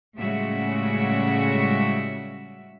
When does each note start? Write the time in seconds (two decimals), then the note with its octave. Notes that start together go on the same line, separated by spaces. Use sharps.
0.16 A2 C#3 G3 G#3 F#4 E5